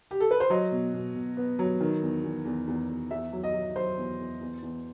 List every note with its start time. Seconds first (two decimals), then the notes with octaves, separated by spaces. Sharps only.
0.11 G4
0.20 A4
0.31 B4
0.40 C5
0.50 F#3 D#5
0.72 B2
0.94 B2
1.15 B2
1.37 B3
1.59 F#3
1.80 D#3
2.02 E2
2.24 E2
2.45 E2
2.67 E2
2.89 E2
3.11 E2 E5
3.32 F#3
3.43 D#5
3.54 F#3
3.76 F#3 C5
3.97 E2
4.19 E2
4.41 E2
4.63 E2